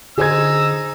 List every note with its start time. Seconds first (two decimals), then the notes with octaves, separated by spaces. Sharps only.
0.18 D3 D#4 G#4 C5 E6 G#6